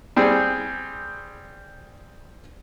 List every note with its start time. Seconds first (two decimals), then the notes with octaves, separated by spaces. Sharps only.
0.16 G3 C4 G#4